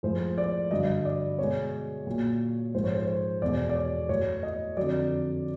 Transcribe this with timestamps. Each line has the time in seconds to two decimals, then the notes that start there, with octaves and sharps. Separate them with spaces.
0.03 A2 F3 G#3 C5
0.38 D5
0.71 G2 D3 F#3 D#5
1.05 D5
1.39 B2 G#3 C#5
2.07 A#2 F#3
2.75 G#2 F3 G#3 C5
2.84 C#5
2.94 C5
3.07 C5
3.42 E2 B2 G#3 D5
3.69 D5
3.75 C#5
4.09 A2 F#3 C#5
4.43 D#5
4.77 F2 D3 F#3 D5